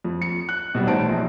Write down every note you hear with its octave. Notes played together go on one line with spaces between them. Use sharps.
F2
C#7
F#6
B2 F#3 G3
A1 D#4 C5 A5 D7
A#1